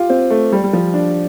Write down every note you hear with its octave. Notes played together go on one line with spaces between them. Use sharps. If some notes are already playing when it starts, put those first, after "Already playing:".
Already playing: F4 G4
C4
A3
G3
G3
F3
D4